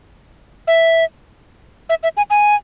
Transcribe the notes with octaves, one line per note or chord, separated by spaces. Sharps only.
E5
E5
E5
G#5
G#5